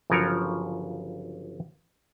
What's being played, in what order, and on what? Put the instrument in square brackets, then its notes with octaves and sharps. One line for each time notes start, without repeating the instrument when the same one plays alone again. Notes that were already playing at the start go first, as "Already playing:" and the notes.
[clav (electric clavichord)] G1 C#3 F3 F#3 A#4 C#5